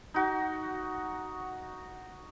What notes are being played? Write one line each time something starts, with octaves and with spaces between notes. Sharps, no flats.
D#4 F#4